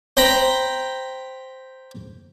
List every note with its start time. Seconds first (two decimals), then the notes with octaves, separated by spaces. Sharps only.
0.17 C5 G5 A#5 B5